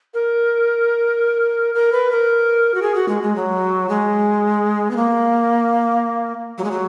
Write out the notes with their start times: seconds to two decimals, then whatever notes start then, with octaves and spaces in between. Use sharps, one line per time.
0.14 A#4
1.74 A#4
1.92 B4
2.11 A#4
2.74 F#4
2.82 G#4
2.95 F#4
3.08 G#3
3.22 G#3
3.36 F#3
3.89 G#3
4.91 B3
4.96 A#3
6.58 F#3
6.64 G#3
6.71 F#3